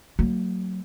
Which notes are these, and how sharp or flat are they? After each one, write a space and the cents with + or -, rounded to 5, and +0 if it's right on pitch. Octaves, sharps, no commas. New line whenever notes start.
F#3 +10 A#3 -40